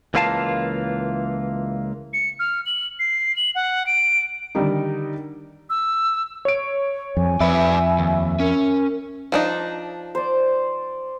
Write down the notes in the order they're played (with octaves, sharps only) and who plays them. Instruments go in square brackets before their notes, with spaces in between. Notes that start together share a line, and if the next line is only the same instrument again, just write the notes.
[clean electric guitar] C#2 E3 A#3 F4 F5 A5
[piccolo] C#7
F6
F#7
C7
F#7
F#5
D7
[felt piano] D3 D#3 G3 D#4
[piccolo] E6
[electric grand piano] C#5 D7
[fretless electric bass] F2 [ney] G#5
[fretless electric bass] F2 [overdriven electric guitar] B4 D5 [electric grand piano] E5 B5
[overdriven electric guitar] D#2
[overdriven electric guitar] C#4 [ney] A#4
[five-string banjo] F3 D4 D#4
[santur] C5 D5